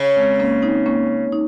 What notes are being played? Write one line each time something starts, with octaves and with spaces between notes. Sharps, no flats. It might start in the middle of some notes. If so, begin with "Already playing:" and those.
Already playing: C#3
G#3 C4
A#3 C#4
C4 D#4
A#3 C#4
D#4